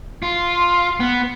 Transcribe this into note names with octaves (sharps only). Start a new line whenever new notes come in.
F4
B3